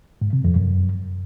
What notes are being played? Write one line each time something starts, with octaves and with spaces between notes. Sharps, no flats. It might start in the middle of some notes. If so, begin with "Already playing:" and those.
G#2
C3
F2
F#2